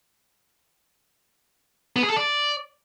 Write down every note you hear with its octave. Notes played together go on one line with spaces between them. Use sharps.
B3
G#4
A4
D5